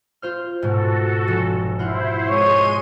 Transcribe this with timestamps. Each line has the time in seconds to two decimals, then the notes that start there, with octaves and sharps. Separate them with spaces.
0.22 F4 C5 F6
0.62 G#2 B2 F#4 A4
1.28 F1
1.79 E4 F4 C5 F#5
2.29 G#3 C#5 C6 D#7